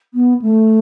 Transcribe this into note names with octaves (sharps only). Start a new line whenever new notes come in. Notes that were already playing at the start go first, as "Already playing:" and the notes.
B3
A3